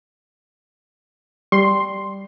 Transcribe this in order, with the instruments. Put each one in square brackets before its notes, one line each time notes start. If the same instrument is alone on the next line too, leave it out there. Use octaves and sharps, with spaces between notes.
[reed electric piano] G3 [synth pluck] C6